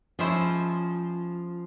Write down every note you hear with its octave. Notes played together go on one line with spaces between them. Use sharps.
F3 G#3 C#4 E4 G#4 C5